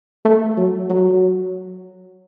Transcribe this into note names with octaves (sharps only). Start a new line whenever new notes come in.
A3
F#3
F#3